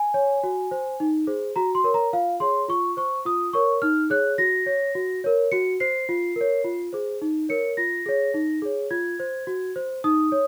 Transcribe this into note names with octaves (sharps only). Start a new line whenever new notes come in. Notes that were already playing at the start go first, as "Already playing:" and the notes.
Already playing: G#5
C#5
F#4
C5
D#4
G#4 C5
F#4 A#5
C6
A#4 C#5
A#5
F4 F5
G#4 C#5 C6
F4 C#6
C5 C#6
F4 D#6
A#4 C#5 C#6
D#4 F6
G#4 C#5 F#6
F#4 A#6
C#5
F#4
A#4 C#5
F#4 C#7
C5 C7
F4
A#4 C#5
F4
G#4 C5
D#4
A#4 C#5 C#7
F4 A#6
G#4 C#5
D#4
G#4 C#5
F4 G#6
C5
F#4
C5
D#4 D#6
C#5